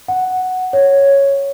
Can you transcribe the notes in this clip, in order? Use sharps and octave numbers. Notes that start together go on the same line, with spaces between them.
F#5
C#5